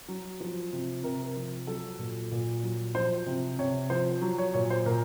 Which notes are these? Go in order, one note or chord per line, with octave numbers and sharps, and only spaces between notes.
F#3
F3
C3
C3 A#4
F3
F#3 A4
A#2
A#2
F#3
F3 C5
C3
C3 C#5
F3 C5
F#3
C#5
A#2 C#5
C5
A#2 A#4